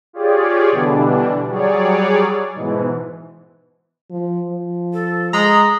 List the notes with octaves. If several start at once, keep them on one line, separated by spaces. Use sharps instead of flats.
F4 G4 G#4 C#5 D5
B2 D3 E3 G3 D4
F#3 G3 G#4 C#5 D5
G#2 B2 E3
F3
F3
A4
G#3 A#5 D#6